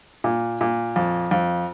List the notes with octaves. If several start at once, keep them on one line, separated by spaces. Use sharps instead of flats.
A#2
A#2
F2
F2